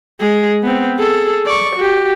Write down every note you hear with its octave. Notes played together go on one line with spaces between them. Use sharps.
G#3 G#4
B3 C4
G#4 A4
D5 C#6
F#4 G4